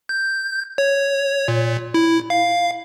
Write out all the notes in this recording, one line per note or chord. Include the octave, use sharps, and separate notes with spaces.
G6
C#5
A#2
E4
F5